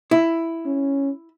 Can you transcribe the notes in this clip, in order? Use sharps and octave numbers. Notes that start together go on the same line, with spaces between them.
E4
C#4